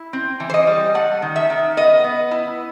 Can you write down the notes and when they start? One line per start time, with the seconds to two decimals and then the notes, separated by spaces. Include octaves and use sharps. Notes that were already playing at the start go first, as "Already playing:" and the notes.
Already playing: E4
0.13 C4
0.40 E3
0.50 C5
0.54 D#5
0.67 G3
0.94 A3 F#5
1.22 D#3
1.36 E5
1.50 D#3
1.77 B3 D#5
2.04 B3
2.31 E4